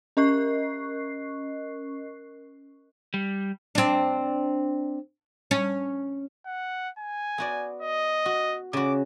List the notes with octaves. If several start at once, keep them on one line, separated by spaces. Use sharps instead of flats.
C#4 A#4 D#5 C#6 F#6 C7
G3
C4 D4
C#4
F#5
G#5
B3 F#4 D5
D#5
F#4
C#3 F#4 D6